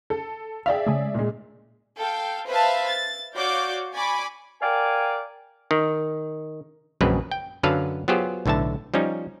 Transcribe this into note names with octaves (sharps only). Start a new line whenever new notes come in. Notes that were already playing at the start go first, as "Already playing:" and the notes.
A4
G#4 D5 E5 F5 G5
C#3 G#3 A3
A#2 G#3
A4 F5 G5
B4 C5 E5 F5 A5
A6
F#4 C#5 D5 F5 D6 G6
D5 G#5 B5 C#6 D6
A#4 D5 F5 G5 G#5
D#3
A#1 F#2 C#3 G#3 C4 B4
G5
F#2 D3 F#3 B4 F5 A5
F#3 B3 F4 G4 G#4 C5
B1 A2 D3 E5 A5
F3 G3 C#4 D#4